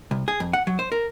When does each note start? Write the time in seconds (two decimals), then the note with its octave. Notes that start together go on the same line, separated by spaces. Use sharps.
0.11 C2
0.28 G#4
0.40 F2
0.53 F#5
0.67 F#3
0.79 C5
0.92 A#4